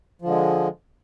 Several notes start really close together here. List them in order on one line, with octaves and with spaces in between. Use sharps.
F3 D3 G#3